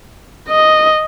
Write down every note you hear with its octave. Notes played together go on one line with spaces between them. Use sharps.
D#5